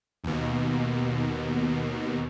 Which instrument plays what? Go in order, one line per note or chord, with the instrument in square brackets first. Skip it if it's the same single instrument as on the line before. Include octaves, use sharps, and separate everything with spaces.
[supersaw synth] D#2 B2